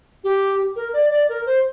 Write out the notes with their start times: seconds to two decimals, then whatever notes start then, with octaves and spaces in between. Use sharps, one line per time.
0.24 G4
0.76 A#4
0.93 D5
1.11 D5
1.29 A#4
1.46 C5